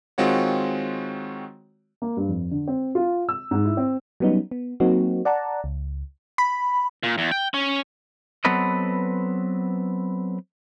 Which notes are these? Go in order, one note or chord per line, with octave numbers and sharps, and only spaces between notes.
D#3 G#3 C4 F4 F#4 C#5
A#3
G2
F2
D3
C4
F4
E6
G#2
E4
C4
F#3 G3 B3 C#4 D#4
B3
F#3 A#3 C4 D#4 F#4
D5 F#5 A5 A#5
C#2
B5
A#2
E2
G5
C#4
F#3 B3 C4 A4 B4 D#5